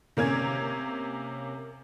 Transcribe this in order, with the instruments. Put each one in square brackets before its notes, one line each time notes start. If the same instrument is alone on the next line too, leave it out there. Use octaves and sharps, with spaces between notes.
[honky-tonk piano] C3 A#3 C#4 G#6